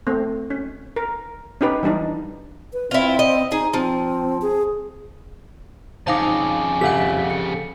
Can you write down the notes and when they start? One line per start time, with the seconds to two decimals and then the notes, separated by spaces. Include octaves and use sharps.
0.07 A3 C4
0.50 C#4
0.96 A#4
1.61 C#4 D#4 G4 B4
1.83 E3 G3 D4 D#4
2.73 B4
2.91 C4 E4 F4
3.19 D#5
3.52 D#4 G#4
3.74 F3 C4
4.42 G#4
6.07 F2 C#3 D#4 C5 F5 A5 D6
6.81 G4 A4 F5 F#5 B6
7.30 C#7